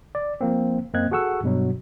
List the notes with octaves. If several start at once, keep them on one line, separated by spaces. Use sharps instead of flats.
D5
F3 A#3 C4
F#2 A#3 C4 D#5 F#6 G#6
F#4 G#4 A4 F#5 C#6 E6
G2 B2 F#3